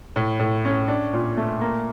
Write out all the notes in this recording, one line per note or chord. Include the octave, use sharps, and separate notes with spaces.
A2
A2
C#4
D4
A#2
A3
A#3